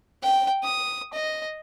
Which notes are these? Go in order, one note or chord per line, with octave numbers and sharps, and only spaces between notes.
G5
D#6
D#5